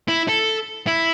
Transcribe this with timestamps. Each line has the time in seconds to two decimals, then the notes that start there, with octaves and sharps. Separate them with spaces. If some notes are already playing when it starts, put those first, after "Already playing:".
0.08 E4
0.28 A4
0.87 E4